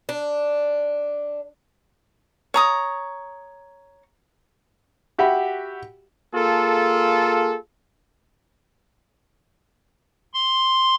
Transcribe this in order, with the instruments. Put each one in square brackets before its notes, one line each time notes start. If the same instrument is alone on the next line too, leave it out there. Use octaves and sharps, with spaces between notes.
[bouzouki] D4
[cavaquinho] C#5 A#5 D#6
[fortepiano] F#4 G4 E5 F#5 B5
[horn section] A#3 F4 G#4 A4
[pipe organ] C6